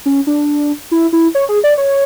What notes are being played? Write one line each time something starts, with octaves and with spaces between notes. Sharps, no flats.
C#4
D4
E4
E4
C#5
G#4
D5
C#5